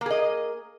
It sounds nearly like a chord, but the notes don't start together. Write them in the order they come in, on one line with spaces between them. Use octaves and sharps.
A#3 G#4 D#5